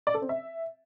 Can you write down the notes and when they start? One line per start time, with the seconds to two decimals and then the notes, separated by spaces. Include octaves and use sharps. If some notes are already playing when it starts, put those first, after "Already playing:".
0.07 D5
0.14 A4
0.22 C4
0.29 E5